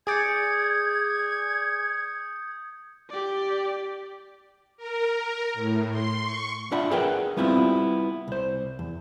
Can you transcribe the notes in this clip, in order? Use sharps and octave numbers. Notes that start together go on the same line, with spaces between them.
G#4 D5 D#6 G6 G#6 C#7
G4 D5
A#4
A#4
A2
C6
C#6
D4 F4 D5 E5 F#5 B5
G#4 A#4 B4 E5 F#5 G5
G3 B3 C4 E4 F4 G4
C2 C5
E2